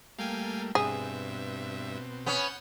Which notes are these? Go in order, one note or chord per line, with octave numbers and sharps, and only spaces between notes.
G3 A3 A#3 F5 G5 G#5
G2 B2 C4 G#4 E5
B3 C#4 F#5 G6